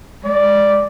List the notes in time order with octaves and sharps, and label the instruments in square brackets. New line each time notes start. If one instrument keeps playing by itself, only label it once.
[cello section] G#3 [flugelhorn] D5